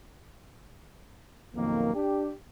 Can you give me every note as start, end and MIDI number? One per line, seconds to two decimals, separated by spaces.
1.55 1.94 35
1.55 1.94 41
1.55 1.94 51
1.55 1.94 58
1.95 2.32 62
1.95 2.32 67